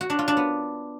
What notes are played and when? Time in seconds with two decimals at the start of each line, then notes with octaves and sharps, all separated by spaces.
0.01 F#4
0.10 D4
0.19 F4
0.28 D4
0.37 B3